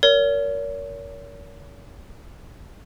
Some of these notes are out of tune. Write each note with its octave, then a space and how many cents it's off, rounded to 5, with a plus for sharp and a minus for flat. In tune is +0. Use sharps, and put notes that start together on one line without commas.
A#4 +0 C#5 +40